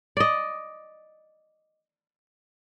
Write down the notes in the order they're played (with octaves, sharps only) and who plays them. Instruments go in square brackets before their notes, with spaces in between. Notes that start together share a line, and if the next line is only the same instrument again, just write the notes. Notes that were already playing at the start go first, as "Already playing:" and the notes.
[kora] D5 D#5